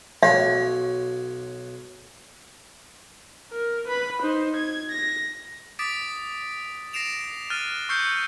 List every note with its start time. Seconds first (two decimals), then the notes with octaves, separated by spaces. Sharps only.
0.23 B1 F#4 C#5 F5
3.52 A#4
3.88 B4 B5
4.22 D#4 C5
4.57 G#6
4.92 A#6
5.79 D6 D#6 A6 B6 D7
6.93 A#6 C7 D7 E7 F7
7.50 F6 F#6 A6 D#7
7.89 C#6 E6 F6 G6 C7 C#7